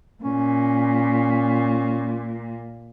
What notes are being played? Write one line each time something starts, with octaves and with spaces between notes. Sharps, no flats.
A#2 C#4